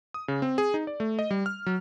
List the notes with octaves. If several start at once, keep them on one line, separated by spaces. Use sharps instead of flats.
D#6
C#3
C4
G#4
D#4
D5
A3
D#5
G3
F6
F#3